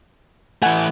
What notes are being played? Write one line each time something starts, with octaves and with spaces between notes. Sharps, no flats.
E3 A3 F#5 G#5